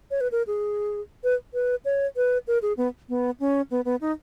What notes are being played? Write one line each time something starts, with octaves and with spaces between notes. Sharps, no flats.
C#5
B4
A#4
G#4
B4
B4
C#5
B4
A#4
G#4
B3
B3
C#4
B3
B3
D#4